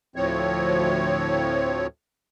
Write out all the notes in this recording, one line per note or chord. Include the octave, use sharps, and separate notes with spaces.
D2 A2 F3 C4 C#5